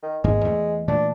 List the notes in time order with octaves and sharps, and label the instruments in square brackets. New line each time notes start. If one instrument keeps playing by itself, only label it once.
[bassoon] D#3
[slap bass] G#1 G#2 A#3 [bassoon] G#3
[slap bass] E2 A3
[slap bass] A#2 E3 A3 [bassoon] D4